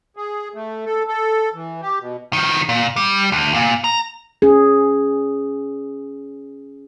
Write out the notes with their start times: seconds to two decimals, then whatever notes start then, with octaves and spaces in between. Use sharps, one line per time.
0.17 G#4
0.54 A3
0.85 A4
1.08 A4
1.54 E3
1.81 G4
2.00 B2
2.33 D#3 F3
2.69 A#2
2.96 G3
3.32 D2
3.54 A#2
3.84 A#5
4.42 C#4 G#4